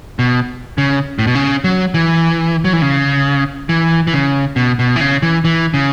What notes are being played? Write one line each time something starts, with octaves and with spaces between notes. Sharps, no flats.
B2
C#3
A2
B2
C#3
F#3
E3
F#3
E3
C#3
E3
E3
C#3
B2
B2
E3
C#3
E3
E3
C#3